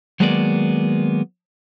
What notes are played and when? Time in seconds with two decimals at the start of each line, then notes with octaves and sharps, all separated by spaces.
0.20 D#3 F#3 G#3 A#3 B3 D5